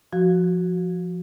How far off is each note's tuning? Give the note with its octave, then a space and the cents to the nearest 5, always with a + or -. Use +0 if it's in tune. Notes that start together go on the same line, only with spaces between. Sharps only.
F3 +0 F#4 +0